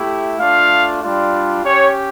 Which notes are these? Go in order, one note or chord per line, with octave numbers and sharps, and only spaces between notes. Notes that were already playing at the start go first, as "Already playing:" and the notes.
Already playing: A3 E4 G4
A3 D4 F4 F5
G3 D4 F4
C#4 G4 C#5